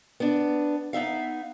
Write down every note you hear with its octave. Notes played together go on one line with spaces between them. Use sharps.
B3 D4
B3 D#4 E5 F5